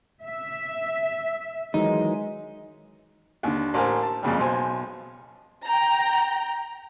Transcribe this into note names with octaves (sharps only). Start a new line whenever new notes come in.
E5
D#3 E3 F#3 G#3 D#4
D#2 D3
A1 A#4 C5 G#5
A5
F2 A#2 C#3 G3
B1 C5 G#5
G5 A#5